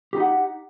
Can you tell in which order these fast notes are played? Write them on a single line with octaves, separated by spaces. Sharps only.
G4 D#4 F#5